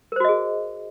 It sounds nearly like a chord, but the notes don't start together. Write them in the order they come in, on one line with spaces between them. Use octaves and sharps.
A#4 C5 F#4 D#5 G#4